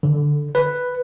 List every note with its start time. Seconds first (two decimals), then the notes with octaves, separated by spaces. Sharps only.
0.03 D3
0.55 B4